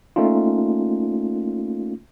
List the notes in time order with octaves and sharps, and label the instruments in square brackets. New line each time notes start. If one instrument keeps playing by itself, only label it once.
[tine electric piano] A3 A#3 C#4 D#4 F4